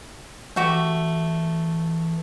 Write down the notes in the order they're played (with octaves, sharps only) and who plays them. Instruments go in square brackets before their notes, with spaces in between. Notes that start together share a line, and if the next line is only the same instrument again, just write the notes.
[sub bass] E3 [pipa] A3 F#4 G4